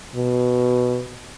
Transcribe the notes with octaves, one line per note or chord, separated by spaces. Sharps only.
B2